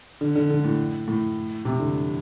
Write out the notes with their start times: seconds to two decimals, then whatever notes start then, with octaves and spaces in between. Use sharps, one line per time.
0.21 D3
0.35 D3
0.50 D3
0.64 A2
1.08 A2
1.65 C3
1.80 D3